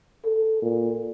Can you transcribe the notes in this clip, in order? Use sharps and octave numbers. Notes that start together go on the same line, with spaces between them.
A4
A#2